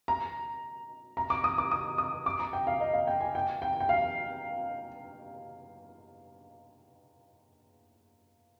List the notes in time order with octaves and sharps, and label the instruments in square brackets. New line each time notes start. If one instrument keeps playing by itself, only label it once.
[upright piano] A#5
A#5
D6
D#6
D6
D#6
D#6
D6
A#5
G5
F5
D#5
F5
G5
G#5
G5
G5
G5
F5